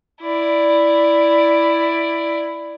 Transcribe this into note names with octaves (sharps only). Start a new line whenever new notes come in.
E4 D5